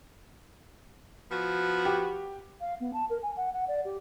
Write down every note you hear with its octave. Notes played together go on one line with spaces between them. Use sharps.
F3 B3 F#4
G4
F5
B3
A5
A#4
G#5
F#5
F#5
D5
G4